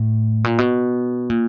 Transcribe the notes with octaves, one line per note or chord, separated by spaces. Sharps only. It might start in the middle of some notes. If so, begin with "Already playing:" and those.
Already playing: A2
A#2
B2
A#2